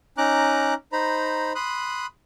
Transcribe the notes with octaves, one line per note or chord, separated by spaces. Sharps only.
C#4 D#4 A#5 D6 F#6
D#4 C5 A#5 B5
B5 C6 D#6 F#6